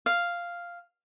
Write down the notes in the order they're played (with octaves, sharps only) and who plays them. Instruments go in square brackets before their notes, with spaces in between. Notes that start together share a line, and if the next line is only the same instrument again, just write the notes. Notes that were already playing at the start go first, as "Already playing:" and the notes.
[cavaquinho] F5